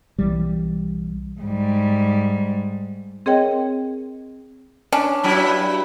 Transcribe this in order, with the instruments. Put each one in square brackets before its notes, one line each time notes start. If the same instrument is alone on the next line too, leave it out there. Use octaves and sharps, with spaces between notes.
[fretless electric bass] B1 E3 G3
[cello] G#2 G3
[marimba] C4 G#4 A#4 C#5 D#5 G5
[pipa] C#4 D4
[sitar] G2 F#3 E4